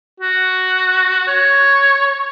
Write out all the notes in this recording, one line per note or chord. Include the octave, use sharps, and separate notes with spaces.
F#4
C#5